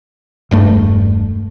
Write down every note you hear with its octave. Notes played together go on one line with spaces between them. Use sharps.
E1 G2 A3